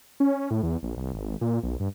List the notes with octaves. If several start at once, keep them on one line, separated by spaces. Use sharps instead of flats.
C#4
A2
E2
A#1
C2
G#1
A#2
B1
G2